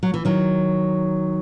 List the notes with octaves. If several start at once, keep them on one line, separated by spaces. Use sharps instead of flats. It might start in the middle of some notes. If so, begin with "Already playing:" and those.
F#3
E3
D#3 F#3